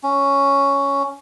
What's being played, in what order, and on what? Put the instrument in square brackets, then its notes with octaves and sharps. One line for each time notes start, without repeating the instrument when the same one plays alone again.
[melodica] C#4